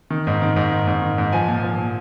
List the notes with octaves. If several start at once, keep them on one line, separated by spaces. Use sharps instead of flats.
D#3
G#2
D#3
G#2
D#3
G#2
D#3
G#2
F3 G#5
A#2
F3
A#2